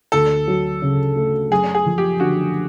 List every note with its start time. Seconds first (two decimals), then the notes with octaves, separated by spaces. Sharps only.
0.12 D2 A4
0.48 F#3
0.82 C#3
1.16 A3
1.50 F#2 G#4
1.75 G#4
1.86 F3
1.98 G4
2.20 D3 F#4